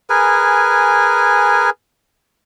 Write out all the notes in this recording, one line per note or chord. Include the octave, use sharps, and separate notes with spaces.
G#4 A#4 B4 G#5